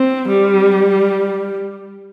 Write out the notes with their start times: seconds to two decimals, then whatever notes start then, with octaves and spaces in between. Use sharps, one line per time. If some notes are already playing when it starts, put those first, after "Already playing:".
Already playing: C4
0.28 G3